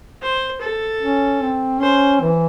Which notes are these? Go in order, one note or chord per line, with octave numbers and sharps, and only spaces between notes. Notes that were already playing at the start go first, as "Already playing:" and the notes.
C5
A4
C#4
C4
C#4 C5
E3